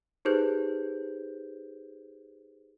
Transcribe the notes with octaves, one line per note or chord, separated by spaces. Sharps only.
D#4 G4 G#4 B4 C5 G6